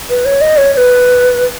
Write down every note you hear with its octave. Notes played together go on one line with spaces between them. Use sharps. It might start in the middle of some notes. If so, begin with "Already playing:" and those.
B4
C#5
D#5
C#5
C#5
B4